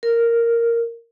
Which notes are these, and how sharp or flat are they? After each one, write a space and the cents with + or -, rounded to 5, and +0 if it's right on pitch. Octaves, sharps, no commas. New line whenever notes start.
A#4 -5